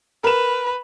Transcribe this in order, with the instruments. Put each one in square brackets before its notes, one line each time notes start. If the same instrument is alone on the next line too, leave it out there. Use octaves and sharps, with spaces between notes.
[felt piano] A#4 E7 [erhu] B4